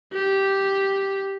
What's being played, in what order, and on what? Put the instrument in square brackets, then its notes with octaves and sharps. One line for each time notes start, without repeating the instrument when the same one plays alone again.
[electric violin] G4